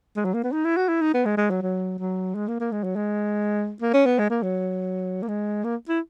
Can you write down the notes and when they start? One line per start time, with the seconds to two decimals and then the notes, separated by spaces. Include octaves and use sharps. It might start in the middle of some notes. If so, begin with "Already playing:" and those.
0.16 G#3
0.25 F#3
0.34 A#3
0.44 B3
0.52 D#4
0.65 E4
0.77 F#4
0.89 E4
1.01 D#4
1.14 B3
1.25 G#3
1.37 G#3
1.50 F#3
1.62 F#3
1.99 F#3
2.35 G#3
2.48 A#3
2.60 A#3
2.72 G#3
2.84 F#3
2.96 G#3
3.82 A#3
3.94 C#4
4.06 B3
4.19 G#3
4.30 A#3
4.43 F#3
5.23 A#3
5.28 G#3
5.64 A#3
5.89 E4